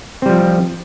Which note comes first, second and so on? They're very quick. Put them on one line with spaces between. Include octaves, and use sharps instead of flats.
C4 G3 F3